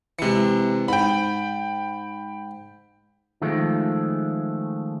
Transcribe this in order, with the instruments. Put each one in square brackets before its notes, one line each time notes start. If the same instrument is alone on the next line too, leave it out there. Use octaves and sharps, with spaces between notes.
[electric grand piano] C3 C#7 [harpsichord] E3 G#3
[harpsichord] G#2 [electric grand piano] G5 B5
[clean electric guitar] D#3 F3 G#3 A3